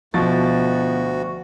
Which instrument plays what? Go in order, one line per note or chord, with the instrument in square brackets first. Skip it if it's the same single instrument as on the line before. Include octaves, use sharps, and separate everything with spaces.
[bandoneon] D2 F#4 [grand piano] B2 F3 A6